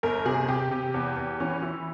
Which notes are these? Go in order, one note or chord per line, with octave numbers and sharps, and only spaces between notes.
G1 A#4
C3 G#4
C3 G4
C3
E2
E2
E3 C#4
E3 E4